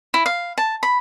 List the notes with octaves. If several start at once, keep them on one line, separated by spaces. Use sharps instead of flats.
E4
F5
A5
B5